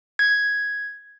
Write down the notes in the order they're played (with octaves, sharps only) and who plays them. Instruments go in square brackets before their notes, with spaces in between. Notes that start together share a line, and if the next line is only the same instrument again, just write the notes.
[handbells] G#6